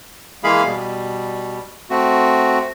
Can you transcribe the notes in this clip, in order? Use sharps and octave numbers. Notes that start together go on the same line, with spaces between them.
E3 G#3 A#3 G#4 F5 B5
B2 G3
A3 C4 F#4